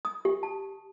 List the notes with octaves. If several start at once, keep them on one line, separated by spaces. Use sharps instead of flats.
D#6
G4
A5